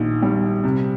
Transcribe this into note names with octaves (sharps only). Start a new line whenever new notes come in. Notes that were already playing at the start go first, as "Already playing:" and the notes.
Already playing: A#1 D#3
G3
C3